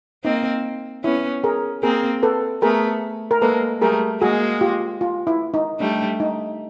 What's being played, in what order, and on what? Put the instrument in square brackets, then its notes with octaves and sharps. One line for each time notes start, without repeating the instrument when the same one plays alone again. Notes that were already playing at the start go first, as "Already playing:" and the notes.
[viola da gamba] A#3 C4 [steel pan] D#4
[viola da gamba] B3 C#4 [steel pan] E4
[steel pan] G#4 A#4
[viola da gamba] A#3 C4 [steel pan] G#4 A#4
[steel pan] A4 B4
[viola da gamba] A3 B3 [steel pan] G#4 A#4
[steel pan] A#4
[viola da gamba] G#3 A#3 [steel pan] A4 B4
[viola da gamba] G3 A3 [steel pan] G#4 A#4
[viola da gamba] G#3 A#3 [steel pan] F#4 G#4
[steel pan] F4 G4
F4
E4
D#4
[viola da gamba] G3 A3 [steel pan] D4
[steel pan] D#4